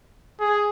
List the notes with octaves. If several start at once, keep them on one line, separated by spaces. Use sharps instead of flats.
G#4